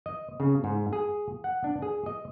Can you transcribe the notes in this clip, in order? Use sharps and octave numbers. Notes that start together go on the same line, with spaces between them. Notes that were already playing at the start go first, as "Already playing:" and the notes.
D#5
C#3
G#2
G#4
F#5
D4
G#4
D#5